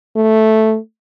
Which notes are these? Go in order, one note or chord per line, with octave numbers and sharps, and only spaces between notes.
A3